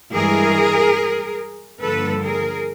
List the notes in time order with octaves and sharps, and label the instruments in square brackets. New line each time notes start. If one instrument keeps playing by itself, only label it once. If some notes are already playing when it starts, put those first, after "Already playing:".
[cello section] G2 E3 G#3 G#4 A#4
G2 D3 F3 A#3 A4 B4
G#4 A#4